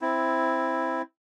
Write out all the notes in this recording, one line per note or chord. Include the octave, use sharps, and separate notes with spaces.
C4 E4